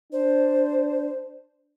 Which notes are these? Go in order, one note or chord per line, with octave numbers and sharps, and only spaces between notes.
D4 C5